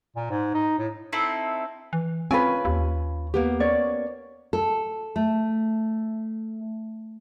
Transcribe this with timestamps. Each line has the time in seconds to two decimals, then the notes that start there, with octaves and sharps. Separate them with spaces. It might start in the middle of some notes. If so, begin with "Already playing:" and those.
0.16 A#2
0.30 G#2
0.55 D#4
0.79 A2
1.13 C4 D#4 E4 A4
1.93 E3
2.31 C4 C#4 F4 B4 G#5
2.65 D#2
3.34 A#3 B3 G4
3.60 C#4 C#5 D5
4.53 A4
5.16 A3